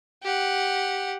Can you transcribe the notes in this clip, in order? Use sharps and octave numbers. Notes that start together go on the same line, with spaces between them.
G4 F#5